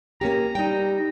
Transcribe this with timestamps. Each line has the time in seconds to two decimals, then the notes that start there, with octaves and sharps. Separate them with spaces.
0.21 A#3 C#4 G4 A#5
0.55 G3 D#4 G5